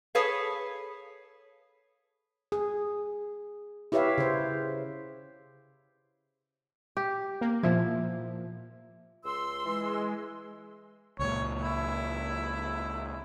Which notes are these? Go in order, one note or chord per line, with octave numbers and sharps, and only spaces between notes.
G#4 A4 B4 C#5 F5
G#4
E4 G4 B4 C#5 E5 F5
C#3 C5
G4
A#3
A#2 F3 E4
C#2 C6 E6
E3 G#3
C#2 A#2 C#5
E4